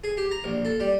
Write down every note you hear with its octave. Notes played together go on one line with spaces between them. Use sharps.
G#4
G4
A#5
A#1
A4
G3